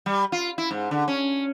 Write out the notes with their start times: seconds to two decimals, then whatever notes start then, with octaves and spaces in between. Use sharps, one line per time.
0.06 G3
0.32 F4
0.58 E4
0.71 G#2
0.91 D3
1.08 C#4